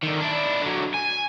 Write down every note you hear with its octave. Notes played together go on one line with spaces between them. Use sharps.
D3 D#3
D4 E4
D3 F#3
G#5